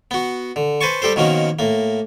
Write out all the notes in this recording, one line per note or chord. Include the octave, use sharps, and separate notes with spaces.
B3 F#4
D3
B4 C5 G#5 A5 C#6
G3 G4 A4 C5
B2 D#3 F3 A#3 C#4 F#4
A2 A#3